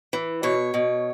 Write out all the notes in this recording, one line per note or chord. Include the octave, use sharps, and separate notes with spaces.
E3
B2 C#5
B2